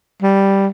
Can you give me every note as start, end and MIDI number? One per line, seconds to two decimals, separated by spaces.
0.22 0.67 55